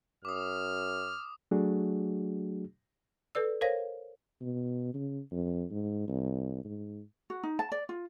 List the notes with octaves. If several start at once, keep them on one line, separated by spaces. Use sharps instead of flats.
F#2 D6 D#6 F6
F#3 A3 D4 F#4 G#4
A4 B4 D5 E6
A#4 C5 C#5 F5 A#6
B2
C#3
F2
G#2
C2
G#2
F#4
D#4
A5
D5
F4